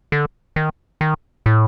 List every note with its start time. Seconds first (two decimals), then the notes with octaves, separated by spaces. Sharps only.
0.12 D3
0.56 D#3
1.01 D#3
1.46 A2